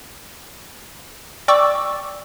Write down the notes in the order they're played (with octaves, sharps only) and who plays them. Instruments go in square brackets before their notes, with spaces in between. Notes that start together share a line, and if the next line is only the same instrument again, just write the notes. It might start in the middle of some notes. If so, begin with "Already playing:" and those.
[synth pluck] D5 G5 C#6 D6 E6